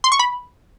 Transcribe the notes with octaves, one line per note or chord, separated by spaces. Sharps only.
C6
C#6
B5